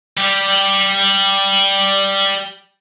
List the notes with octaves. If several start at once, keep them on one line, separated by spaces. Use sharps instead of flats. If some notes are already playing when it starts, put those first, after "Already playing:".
G3 G4